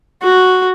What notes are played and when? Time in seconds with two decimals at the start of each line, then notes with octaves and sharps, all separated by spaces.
0.23 F#4